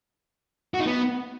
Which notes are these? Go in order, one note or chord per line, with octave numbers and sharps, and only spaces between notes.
F#4
D#4
B3